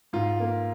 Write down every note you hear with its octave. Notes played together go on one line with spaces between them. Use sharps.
G#2 F4
A#3